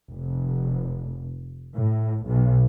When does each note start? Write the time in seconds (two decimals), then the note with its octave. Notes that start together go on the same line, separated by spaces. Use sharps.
0.10 F1
1.76 A2
2.26 B1